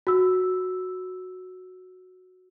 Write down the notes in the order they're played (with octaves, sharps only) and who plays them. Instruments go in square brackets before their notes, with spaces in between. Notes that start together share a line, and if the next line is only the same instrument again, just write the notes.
[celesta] F#4 E6